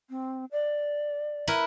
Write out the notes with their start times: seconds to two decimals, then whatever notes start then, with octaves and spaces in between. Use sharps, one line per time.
0.10 C4
0.52 D5
1.47 E4 A#4 B4